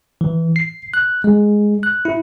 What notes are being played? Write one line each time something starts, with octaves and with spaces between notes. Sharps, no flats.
E3
C7
F#6
G#3
F#6
E4